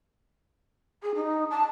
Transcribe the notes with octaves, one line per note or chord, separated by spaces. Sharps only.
G#4
D#4
A5